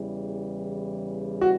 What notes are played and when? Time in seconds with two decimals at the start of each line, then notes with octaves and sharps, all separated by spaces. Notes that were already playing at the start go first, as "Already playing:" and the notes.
Already playing: E2 C#3 E3 G3
1.41 F#4